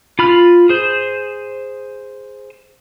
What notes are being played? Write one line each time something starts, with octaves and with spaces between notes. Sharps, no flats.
F4 B5 F6
G#4 C5